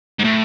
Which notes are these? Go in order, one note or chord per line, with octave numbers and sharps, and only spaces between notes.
G#2
A2